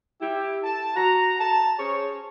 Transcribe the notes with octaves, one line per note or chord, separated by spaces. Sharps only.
E4 G4
A5
F#4 A#5
A5
C#4 G#4 C5 C#5